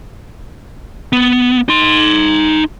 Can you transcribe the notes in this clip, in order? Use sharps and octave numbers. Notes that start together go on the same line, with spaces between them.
B3
D#4 C6